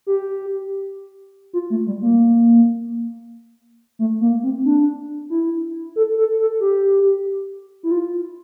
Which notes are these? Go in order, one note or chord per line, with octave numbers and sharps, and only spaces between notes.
G4
F4
A3
G3
A#3
A3
A#3
C4
D4
E4
A4
A4
A4
G4
E4
F4